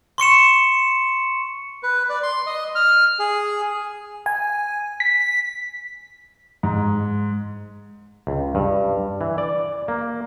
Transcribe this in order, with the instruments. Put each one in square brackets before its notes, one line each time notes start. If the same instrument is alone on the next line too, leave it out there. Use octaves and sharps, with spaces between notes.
[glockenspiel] C6 C#6 C#7 E7
[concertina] B4
D5
C6
D#5
F6
G#4
[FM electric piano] G#5
B6
[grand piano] G#2
[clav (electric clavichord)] C#2
G2
E3
D5
A#3